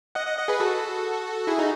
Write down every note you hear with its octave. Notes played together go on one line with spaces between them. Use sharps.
D#5 F#5
D#5 F#5
D#5 F#5
G#4 B4
F#4 A4
E4 G#4
D#4 F#4